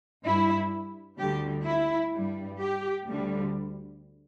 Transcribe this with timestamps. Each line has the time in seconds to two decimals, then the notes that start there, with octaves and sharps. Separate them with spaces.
0.24 G2 G3 E4
1.19 D2 D3 G3 G4
1.66 E4
2.14 G2 G3
2.61 G4
3.08 D2 D3 G3